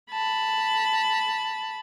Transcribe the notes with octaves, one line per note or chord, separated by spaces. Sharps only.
A5 B5